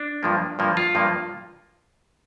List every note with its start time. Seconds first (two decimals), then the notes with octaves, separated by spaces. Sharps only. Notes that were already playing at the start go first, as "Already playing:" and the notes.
Already playing: D4
0.23 G2 F3 A#3
0.59 G2 F3 A#3
0.77 F4
0.95 G2 F3 A#3